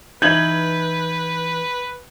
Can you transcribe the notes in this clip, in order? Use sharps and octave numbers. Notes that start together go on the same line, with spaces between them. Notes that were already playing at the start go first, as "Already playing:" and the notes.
E3 D#4 B4 G6 G#6 F#7